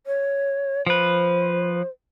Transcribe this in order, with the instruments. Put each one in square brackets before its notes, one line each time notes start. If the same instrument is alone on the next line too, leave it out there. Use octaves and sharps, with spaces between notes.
[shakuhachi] C#5
[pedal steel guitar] F3 B4 [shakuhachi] C5